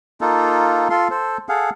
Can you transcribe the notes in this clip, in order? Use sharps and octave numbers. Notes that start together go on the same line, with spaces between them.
A#3 D#4 F4 A4
F4 A4 C6
A4 C5
G#4 A4 F5 F#5